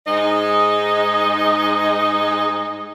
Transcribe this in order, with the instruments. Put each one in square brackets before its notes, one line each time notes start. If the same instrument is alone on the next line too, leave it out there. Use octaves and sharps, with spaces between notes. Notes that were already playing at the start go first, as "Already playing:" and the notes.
[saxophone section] G#2 G#3 D#4 D#5